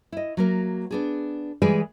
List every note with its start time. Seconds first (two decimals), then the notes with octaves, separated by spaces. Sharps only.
0.12 E4 D#5
0.37 F#3 A#3 A#4
0.91 B3 D4 G#4
1.62 E3 G3 G#3 G#4 B4 D5